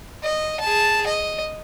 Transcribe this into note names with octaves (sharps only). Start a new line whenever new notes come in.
D#5
G#4 A5
D#5